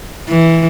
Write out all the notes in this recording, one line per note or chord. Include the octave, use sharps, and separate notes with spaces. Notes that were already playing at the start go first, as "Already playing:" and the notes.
E3